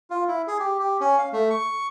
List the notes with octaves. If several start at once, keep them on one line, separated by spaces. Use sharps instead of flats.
F4
E4
G#4
G4
G4
C#4
F5
A3
C#6